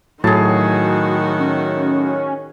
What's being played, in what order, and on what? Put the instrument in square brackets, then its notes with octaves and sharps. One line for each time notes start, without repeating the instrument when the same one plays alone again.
[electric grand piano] A2 F#3 [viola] D#3 F#4 [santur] G#4 A5
[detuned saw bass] C#4